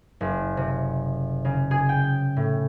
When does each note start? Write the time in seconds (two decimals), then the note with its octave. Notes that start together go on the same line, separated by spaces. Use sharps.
0.21 F#1
0.57 C3
1.45 C#3
1.71 G#4
1.89 G5
2.37 A2